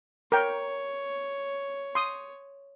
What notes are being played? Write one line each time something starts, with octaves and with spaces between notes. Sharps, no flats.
A#4 C#5 G5
C6 D#6